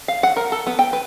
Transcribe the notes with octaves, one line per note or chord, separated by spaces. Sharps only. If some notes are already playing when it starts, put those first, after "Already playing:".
F5
F#5
A#4
A4
B3
G5
B4